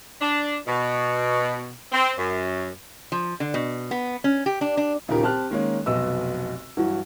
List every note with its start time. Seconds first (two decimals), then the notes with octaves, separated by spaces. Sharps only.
0.21 D4
0.67 B2
1.92 C4
2.18 F#2
3.12 F3
3.40 D3
3.54 B2
3.91 B3
4.24 C#4
4.46 G4
4.61 D4
4.77 D4
5.08 D#1 C#3 F3 D#4 G4 A#4
5.23 C4 G4 A5 F6 F#6
5.50 D#3 G#3 A#3 C#4
5.86 F1 B1 B2 B3 D#5 E6
6.77 G2 E3 F#3 E4 F#4